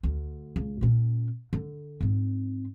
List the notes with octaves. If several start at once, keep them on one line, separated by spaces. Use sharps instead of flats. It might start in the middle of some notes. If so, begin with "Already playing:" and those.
D2
C#2
A#2 C#4
D3
G#2 C4